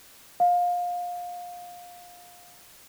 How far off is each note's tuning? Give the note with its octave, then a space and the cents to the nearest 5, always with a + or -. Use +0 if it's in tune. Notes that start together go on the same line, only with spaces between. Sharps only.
F5 +20